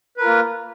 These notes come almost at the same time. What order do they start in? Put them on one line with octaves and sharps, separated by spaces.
B4 A#4 F4 A#3